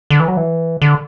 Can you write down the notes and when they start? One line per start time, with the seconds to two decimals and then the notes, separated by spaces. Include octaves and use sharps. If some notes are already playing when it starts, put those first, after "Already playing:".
0.10 D3
0.20 E3
0.28 F#3
0.37 E3
0.82 D3